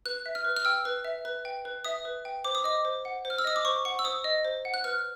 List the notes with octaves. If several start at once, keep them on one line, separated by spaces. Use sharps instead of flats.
B4 F#6
E5
F6
B4
F6
G5 E6
B4
E5
B4
G5
B4
E5 D#6
B4
G5
C5 D6
D#6
D#5 D6
C5
F#5
C5
F6
E6
D#5 D#6
D6
C5 C#6
F#5 C#6
E6
C5 D#6
D#5
C5
F#5
F#6
B4 F6